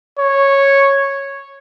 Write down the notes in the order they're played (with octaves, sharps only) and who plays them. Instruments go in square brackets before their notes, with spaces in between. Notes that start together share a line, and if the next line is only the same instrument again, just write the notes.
[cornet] C#5